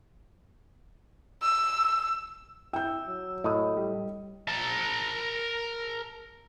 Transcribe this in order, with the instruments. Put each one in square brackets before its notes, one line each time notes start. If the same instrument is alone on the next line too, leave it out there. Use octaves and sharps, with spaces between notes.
[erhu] E6
[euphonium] E4 [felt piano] G5 G6 [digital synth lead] E6
[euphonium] F#3
[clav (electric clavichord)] A2 [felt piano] D#5 D#6
[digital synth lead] G3
[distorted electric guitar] A#4 A5